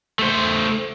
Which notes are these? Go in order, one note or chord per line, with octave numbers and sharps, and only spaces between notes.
A3 C5